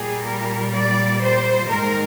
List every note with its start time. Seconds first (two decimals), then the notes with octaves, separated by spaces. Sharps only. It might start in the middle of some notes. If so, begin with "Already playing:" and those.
Already playing: A#2 G3 A#3 G#4
0.24 A#4
0.72 D5
1.20 C5
1.68 G#2 D#3 G#3 A#4